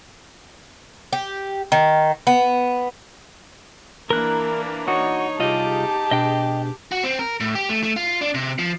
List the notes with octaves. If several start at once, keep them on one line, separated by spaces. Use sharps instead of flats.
G4
D#3
B3
E3 A#3 D4 A#4 F#6
D#4 F#4 C#5
C2 F4 G4 G#4 D#5 A5
B2 D4 D#5 G5
F#4
C4
A#4
A2
G4
A3
A3
F4
D4
C3
F3